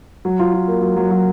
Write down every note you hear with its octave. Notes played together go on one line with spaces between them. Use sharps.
F#3
F4
F4
A#3
F#3
F#3
F#3